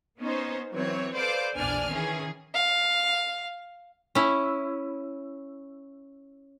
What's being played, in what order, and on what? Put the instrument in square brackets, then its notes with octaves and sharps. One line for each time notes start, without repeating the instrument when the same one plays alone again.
[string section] B3 C#4 D#4 C5
E3 F#3 C4 C#5
A4 B4 C5 D5 F5 D6
A#1 E2 D4 D5 G#5 F6
D#3 E3 C#4 G#4
[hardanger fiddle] F5
[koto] C#4 E4